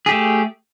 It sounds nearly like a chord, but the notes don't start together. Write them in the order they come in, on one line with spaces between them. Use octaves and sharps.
G#4 G4 A3